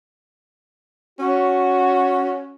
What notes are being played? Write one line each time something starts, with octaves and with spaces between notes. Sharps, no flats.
C#4 F#4